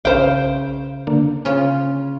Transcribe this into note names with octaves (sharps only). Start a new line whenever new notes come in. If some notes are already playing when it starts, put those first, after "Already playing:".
B1 C#3 B4 C5 F5 G5
D3 A#3 D4
C#3 C#4 F4